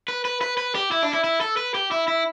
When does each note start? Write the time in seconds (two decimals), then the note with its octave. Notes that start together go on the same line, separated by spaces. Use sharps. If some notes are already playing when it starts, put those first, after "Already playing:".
0.08 B4
0.25 B4
0.41 B4
0.57 B4
0.75 G4
0.91 E4
1.03 D4
1.13 E4
1.24 E4
1.41 A4
1.57 B4
1.74 G4
1.91 E4
2.08 E4